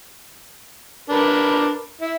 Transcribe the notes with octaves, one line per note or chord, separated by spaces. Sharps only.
D4 A#4 B4
E4